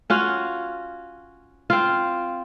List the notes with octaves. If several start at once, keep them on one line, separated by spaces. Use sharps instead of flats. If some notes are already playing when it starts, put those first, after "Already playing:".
C#4 F4 F#4
C4 F4